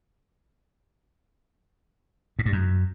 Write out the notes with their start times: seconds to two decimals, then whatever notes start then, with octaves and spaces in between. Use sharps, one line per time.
2.39 G#2
2.46 G2
2.52 F#2